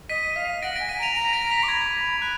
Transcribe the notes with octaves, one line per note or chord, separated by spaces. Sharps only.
D#5 B6 D#7
F5 B6
F#5 A#6 D7
G#5 A#6 D7
B6 D#7
A#5 D7 F7
A#5 D7 F7
A#6 D7
B6
D6
B5 G#6
B5
B5 F#6